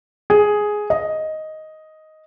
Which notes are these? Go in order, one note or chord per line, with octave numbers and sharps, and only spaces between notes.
G#4
D#5